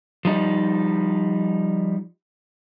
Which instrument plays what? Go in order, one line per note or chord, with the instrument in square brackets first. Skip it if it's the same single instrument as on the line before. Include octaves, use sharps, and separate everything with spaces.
[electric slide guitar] F3 G3 D#4